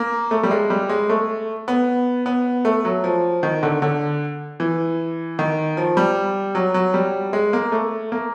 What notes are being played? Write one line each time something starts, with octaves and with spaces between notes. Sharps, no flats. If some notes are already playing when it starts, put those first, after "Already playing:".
Already playing: A#3
A3
G3
G#3
G3
G#3
A3
B3
B3
A3
F#3
F3
D#3
D3
D3
E3
D#3
F3
G3
F#3
F#3
G3
G#3
A#3
A3
A#3